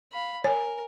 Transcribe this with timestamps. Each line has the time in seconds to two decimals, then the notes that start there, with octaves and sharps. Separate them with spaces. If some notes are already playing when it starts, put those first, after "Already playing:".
0.12 F5 B5
0.44 A#4 C#5 G#5